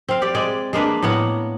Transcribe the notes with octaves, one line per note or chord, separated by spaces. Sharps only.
C4 F5
G4 D5
G#3 D5
G#3 A#3 D4 B4
A2 A#3 B3 F#5